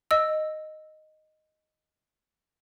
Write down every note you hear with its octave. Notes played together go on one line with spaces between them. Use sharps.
D#5 E6